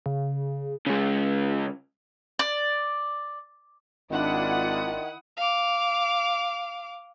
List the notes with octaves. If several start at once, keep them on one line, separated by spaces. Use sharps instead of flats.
C#3
C#3 G#3
D5
G#1 D#3 D4 E4 F4 F#5 D#6
F5 D6